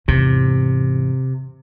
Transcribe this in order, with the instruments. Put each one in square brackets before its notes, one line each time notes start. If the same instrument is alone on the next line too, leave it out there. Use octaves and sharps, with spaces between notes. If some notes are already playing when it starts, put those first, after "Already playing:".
[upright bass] E2 G#2 [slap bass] C3